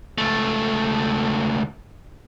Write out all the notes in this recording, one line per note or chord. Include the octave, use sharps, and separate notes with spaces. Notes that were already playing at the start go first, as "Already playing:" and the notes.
C#2 A3